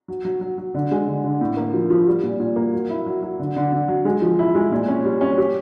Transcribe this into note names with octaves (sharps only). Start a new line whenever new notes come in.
F#3
F#3
F#3
F#3
D3
G#3
D3
D3
A2
A#3
F3
F3
G3
A#2
A#2
A#3
F#3
E4
F#3
F#3
D3
D3
D3
F#3
G#3
F3
E4
G#3
A#2
C#4
G3
C#4
G4